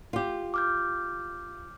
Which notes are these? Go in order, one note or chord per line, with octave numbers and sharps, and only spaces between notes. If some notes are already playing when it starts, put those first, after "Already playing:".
F4 G4
D6 F6 G6